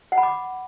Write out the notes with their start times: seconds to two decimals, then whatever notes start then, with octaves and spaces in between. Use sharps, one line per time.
0.12 F#5
0.18 B5
0.23 D6